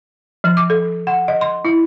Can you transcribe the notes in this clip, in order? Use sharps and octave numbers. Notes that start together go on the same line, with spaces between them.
F3
D6
A4
F#5
D#5
C6
E4